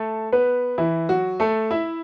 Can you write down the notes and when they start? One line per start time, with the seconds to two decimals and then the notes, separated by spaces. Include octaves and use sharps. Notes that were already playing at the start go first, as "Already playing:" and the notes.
Already playing: A3 A4
0.32 B3 B4
0.78 E3 E4
1.09 F#3 F#4
1.40 A3 A4
1.71 E4 E5